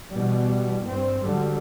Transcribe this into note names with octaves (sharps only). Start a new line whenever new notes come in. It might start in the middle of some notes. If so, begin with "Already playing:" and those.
B2 E3 G3
G2 C4
G#2 D3 F#3 G3